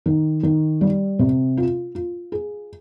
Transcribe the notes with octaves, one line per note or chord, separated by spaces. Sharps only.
D#3
D#3
G3
C3
F4
F4
G#4